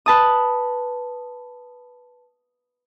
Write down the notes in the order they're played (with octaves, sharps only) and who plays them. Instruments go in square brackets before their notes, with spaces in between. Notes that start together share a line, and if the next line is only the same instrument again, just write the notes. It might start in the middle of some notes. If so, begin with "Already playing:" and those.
[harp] B4 A5 D#6